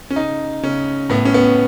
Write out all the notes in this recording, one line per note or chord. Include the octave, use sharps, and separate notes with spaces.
C#4
C#3 D#4
C#3 C#4
A2 B3
C#4
B3